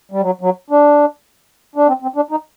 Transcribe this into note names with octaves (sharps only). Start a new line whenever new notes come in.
G3
F#3
F#3
D4
D4
C4
C4
D4
D#4